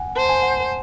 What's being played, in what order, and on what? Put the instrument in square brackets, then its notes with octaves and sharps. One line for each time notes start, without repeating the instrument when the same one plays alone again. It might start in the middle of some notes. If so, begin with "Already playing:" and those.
Already playing: [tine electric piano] F#5 G#5
[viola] C5 [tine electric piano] A5
[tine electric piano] G#5
F#5